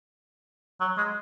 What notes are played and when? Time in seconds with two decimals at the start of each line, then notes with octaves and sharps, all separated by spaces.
0.81 F#3
0.98 G#3